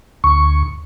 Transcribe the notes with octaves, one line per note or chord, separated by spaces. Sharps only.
D2 C#6